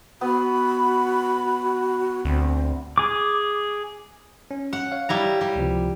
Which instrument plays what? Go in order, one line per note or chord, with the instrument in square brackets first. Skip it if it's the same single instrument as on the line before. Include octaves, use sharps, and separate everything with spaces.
[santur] B3 [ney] F#4 [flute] B5
[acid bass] D2 [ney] C4
[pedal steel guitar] G#4 D6
[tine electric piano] C#4
[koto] F#5
[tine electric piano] C#5 F5
[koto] G3 E4 A#5
G3
[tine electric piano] C#2 C3 F3